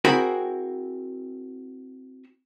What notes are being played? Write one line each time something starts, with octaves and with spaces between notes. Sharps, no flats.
C4 E4 F#4 G#4 A#4 B5